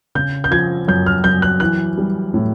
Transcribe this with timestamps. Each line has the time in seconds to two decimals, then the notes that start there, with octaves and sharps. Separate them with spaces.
0.15 C#3 G6
0.44 G6
0.51 F3 G#6
0.88 F#2 G6
1.06 F6
1.24 F#2 G6
1.42 F#6
1.60 E3 F#6
1.98 G3
2.34 A2